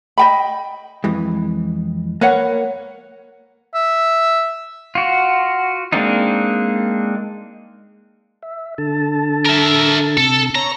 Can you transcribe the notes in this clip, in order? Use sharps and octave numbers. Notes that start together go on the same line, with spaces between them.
D#5 G5 B5
F2 E3 G#3
A#3 B4 C#5 F#5
E5
F4 F#4
G#3 A#3 C4 D4 D#4
E5
D3 A4 A5
A#4 E5
C3 A4
C#5 A#5